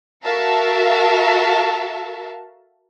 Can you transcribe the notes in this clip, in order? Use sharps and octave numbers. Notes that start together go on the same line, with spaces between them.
F#4 A4 A#4 E5 F5 A5